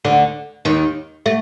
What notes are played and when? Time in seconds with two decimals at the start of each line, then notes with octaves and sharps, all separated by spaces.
0.04 D2 D3
0.65 D#2 D#3
1.26 A3